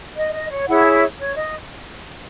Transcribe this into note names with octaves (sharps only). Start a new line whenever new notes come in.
D#5
D#5
C#5
E4 G#4 C#5 F#5
E5
C#5
D#5